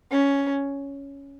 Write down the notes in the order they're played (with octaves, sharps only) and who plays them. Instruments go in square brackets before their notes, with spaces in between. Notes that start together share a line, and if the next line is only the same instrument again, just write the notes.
[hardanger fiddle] C#4